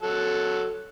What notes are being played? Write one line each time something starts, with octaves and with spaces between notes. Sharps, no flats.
F#3 A4